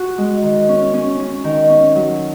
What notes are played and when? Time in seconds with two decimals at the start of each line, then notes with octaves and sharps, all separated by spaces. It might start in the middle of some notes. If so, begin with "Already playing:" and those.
Already playing: F#4
0.18 G#3
0.43 D#3
0.69 C#4
0.94 C#4
1.20 C#4
1.44 D#3
1.70 C#4
1.95 F#3